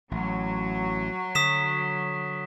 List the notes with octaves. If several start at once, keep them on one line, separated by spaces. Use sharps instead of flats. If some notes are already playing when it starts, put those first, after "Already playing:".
A1 F#3
D3 D#6 B6 E7